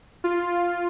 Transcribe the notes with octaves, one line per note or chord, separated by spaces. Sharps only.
F4